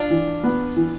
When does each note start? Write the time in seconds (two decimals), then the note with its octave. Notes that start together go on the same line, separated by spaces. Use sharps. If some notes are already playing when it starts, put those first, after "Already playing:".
Already playing: D4 F4
0.10 E3
0.43 B3
0.76 E3